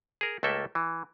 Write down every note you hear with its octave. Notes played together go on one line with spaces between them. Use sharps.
G#4 A#4
C#2 A3 A#3 A4 E5 G5
E3